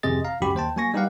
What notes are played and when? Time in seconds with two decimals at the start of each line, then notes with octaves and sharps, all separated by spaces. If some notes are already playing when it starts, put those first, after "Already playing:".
0.03 G#1 F2 C3 G#4 D#5 A6
0.25 F5 A#5
0.42 G#1 C#2 F#2 F#4 G4 B5
0.55 D#2 C5 G5 A5
0.76 F#3 A#3 G#5 C#6 A#6
0.94 G3 D#4 G4 B4 F5 F#5